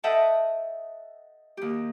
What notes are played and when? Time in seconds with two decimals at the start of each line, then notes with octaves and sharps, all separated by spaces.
0.04 A4 D#5 E5 F#5 G5 A5
1.57 D#2 G4